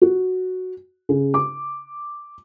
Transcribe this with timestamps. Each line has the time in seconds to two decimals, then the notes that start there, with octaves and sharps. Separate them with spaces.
0.02 F#4
1.09 C#3
1.34 D6